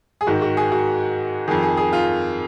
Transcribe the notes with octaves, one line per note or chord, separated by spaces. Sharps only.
G#4
G#2 D#3 F#4
F#4
G#4
F#4
F2 D#3 G#4
G#4
G#4
F4